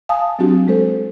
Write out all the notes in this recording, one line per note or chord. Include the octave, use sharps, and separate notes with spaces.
F5 G#5 A5 D#6
F#3 C4 D4 F#4 G4
G#3 A4 C5